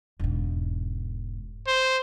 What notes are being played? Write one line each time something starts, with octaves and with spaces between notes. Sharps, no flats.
E1 G#2
C5